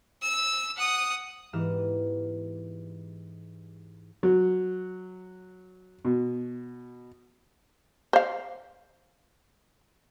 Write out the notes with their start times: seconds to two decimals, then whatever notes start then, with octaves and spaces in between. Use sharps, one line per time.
0.22 E6
0.77 F#5 D#6
1.53 G#2 E3 B3 G4 F6 E7
4.23 F#3
6.05 B2
8.13 C5 F5